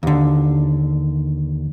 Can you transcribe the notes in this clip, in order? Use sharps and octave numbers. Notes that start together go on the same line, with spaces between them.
D#2 D3